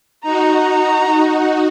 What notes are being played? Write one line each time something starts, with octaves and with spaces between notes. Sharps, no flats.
D#4 F#4 A#5